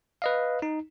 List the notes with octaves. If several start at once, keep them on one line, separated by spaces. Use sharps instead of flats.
B4 D#5 F5
D#4